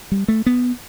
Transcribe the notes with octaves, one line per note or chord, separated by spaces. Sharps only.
G3
A3
B3